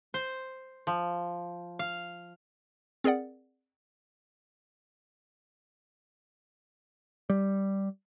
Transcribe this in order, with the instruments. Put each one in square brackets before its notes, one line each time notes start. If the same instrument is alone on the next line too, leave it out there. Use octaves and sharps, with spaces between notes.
[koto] C5
F3
F5
[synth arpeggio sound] C4 G#4 A#4 D5 F#5
[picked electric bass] G3